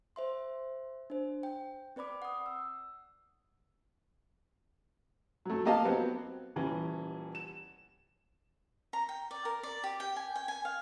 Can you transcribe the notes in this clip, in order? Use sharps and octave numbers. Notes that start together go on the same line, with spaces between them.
C5 E5 C6
D4 C5
G5
C4 B4 D5 B5 D6
F#5 D#6
E6
F#3 A3
A#3 G4 D#5 F5 A5
F#3 B3 C4
D#1 E3 C#4
E7
A#5
G5
D5
A#4
D5
G4
G5
G#5
G5
G#5
F5